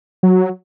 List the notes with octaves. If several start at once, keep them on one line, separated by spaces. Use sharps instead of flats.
F#3